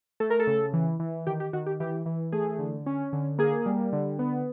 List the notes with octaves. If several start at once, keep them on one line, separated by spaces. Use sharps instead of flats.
A3 A4
A#4
A4
C#3
E3
E3
D#3 G4
G4
D#3 F#4
G4
E3 G4
E3
A3 G#4
D3
C#4
D3
A#3 G#4
G3
D3
B3